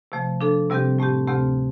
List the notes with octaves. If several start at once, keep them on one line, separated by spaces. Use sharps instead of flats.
C3 F3 A3
F3 D4 A4
C3 G3 C4 G4
A2 A3 C4 G4
D2 C3 A3 C4 G4